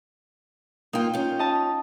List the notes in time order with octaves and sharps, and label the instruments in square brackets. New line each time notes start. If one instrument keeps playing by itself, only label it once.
[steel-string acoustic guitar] A#3 F4 [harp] D#4 G5
[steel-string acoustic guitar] C#4 F4
[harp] D#5 A5